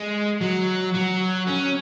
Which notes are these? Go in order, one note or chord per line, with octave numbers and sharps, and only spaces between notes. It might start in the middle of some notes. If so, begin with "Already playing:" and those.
Already playing: G#3
F#3
F#3
C#4